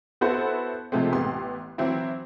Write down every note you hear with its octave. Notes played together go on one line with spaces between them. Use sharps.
B3 E4 F#4 A4 B4 C5
C3 F3 G#3 A3 C4
A1 B3 G4 C6
E3 F#3 C4 E4